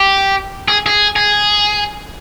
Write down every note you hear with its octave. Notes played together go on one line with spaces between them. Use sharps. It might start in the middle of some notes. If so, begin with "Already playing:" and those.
Already playing: G4
G#4
G#4
G#4